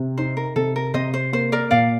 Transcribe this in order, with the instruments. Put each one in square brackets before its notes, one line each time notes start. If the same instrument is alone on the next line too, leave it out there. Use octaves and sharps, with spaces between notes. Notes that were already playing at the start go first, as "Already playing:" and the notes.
Already playing: [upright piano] C3
[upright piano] D#4 [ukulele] C5
[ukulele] A#4
[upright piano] C3 [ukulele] A4
[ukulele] A#4
[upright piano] C3 [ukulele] C5 D#5
[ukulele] C5
[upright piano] A#3 [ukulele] C5
[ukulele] A#4 D5
[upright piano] A#2 [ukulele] D5 F5